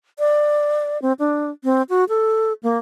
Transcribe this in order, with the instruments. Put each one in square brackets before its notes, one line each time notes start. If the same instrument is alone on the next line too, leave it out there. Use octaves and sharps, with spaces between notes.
[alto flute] D5
C4
D4
C4
F#4
A4
A#3